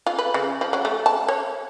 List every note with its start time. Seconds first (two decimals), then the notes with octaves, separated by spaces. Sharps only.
0.07 F4
0.18 B4
0.34 C#3
0.61 F3
0.73 F#3
0.85 A3
1.06 A5
1.28 C#5